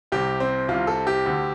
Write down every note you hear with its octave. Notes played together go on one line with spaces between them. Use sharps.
C2 C3 G4
C4
C2 C3 F4
A4
G4
D2 D3